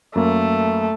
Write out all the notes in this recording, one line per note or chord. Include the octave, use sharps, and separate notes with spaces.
F#2 A3 A#3